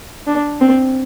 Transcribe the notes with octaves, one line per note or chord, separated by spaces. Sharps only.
D4
C4